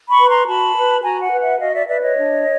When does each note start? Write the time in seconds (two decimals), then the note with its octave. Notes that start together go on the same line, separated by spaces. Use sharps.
0.10 B5 C#6
0.19 B4
0.29 A#5 C6
0.47 F#4 A5 B5
0.76 B4
1.03 F#4 G#5 A#5
1.21 F#5 G#5
1.31 B4
1.41 E5 F#5
1.59 F#4 D#5 F5
1.73 D5 E5
1.87 B4 D5 E5
2.01 C#5 D#5
2.16 D4